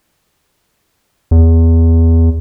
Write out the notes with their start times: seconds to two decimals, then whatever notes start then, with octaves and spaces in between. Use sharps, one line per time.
1.31 E2